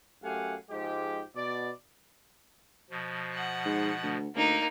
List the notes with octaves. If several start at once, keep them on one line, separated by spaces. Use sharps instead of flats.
F#2 A3 G4 F5 F#5 G#5
G#2 F3 G#3 G4
B2 D5
B2 F3
F#5
G#2
D2
D2 A#3 D#4